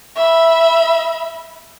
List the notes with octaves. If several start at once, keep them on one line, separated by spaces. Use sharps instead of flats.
E5 B5